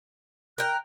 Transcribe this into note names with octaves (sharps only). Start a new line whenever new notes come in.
A#4 G5 F#6